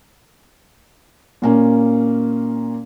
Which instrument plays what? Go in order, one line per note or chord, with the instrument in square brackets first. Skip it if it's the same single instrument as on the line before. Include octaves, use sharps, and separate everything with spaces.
[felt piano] A#2 A#3 C#4